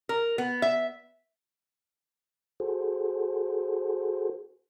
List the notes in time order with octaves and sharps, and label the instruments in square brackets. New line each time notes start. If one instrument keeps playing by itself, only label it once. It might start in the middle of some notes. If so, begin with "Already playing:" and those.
[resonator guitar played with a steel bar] A#4
B3
E5
[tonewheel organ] F#4 G#4 A4 C5